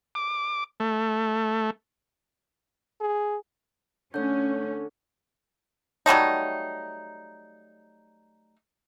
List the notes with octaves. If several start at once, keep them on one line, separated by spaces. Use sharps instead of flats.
D6
A3
G#4
D3 A3 C#4 C#5 G6
F#3 G3 A3 D#4